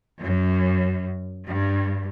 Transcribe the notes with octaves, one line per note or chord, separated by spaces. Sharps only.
F#2
G2